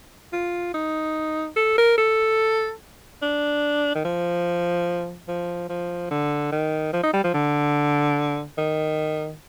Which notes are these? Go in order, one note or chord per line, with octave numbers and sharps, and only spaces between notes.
F4
D#4
A4
A#4
A4
D4
D#3
F3
F3
F3
D3
D#3
F3
D#4
G3
F3
D3
D#3